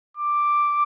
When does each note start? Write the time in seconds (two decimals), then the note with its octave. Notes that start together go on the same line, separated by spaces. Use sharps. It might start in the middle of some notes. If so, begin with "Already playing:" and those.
0.17 D6